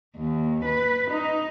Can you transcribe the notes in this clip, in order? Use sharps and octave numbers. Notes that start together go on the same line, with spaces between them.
D#2
B4
D#4